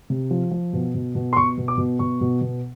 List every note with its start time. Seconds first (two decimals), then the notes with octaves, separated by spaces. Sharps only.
0.10 C3
0.31 F3
0.51 F3
0.73 B2
0.95 B2
1.15 B2
1.33 C6
1.37 B2 C#6
1.58 B2
1.68 D6
1.78 B2
1.99 B2 C#6
2.21 B2
2.41 B2